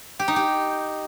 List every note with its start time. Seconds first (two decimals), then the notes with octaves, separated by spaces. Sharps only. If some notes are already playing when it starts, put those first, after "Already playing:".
0.19 G4
0.28 D#4
0.36 G4